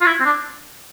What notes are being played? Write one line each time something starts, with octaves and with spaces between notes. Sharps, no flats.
F4
E4
C4
D4